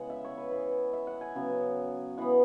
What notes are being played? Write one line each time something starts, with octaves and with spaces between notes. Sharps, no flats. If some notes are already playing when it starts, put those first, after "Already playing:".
Already playing: C#3 E3 G#3 B3 G#4 F#5
E5
C#5
B4
E3 B3
E5
F#5
G#5
C#3 F#3 B3
E3 B3 F#5